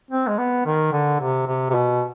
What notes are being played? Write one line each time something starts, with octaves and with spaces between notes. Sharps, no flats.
C4
G#3
B3
D#3
D3
C3
C3
C3
B2